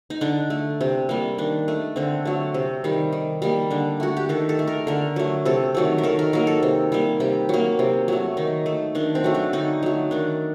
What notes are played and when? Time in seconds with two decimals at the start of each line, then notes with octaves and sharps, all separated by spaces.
0.10 D#4
0.21 D3 D4
0.50 A3
0.81 C3
1.09 G3 A#3
1.38 D#3 D4
1.68 A3
1.96 D3 C4
2.25 F#3 A3
2.54 C3
2.84 D#3 G3
3.12 D#3
3.42 G3 A#3
3.71 D3 D4
4.00 A3 F#4
4.17 G4
4.29 D#3 A4
4.49 A4
4.59 A3
4.67 A#4
4.87 D3 A#4
5.16 F#3 A3
5.45 C3 A4
5.75 D#3 F#3 A3
5.98 A#4
6.03 D#3 A4
6.19 A#4
6.33 F#3 A#3 A#4
6.47 A4
6.63 C3
6.92 G3 A#3
7.20 C3 G4
7.49 F#3 A#3
7.79 C3
8.08 F#3 A3
8.37 D#3 D#4
8.66 A3
8.95 D#3 D4
9.15 C4
9.24 F#3 A3
9.34 D4
9.53 D3 D#4
9.83 F#3 A3
10.11 D#3 D4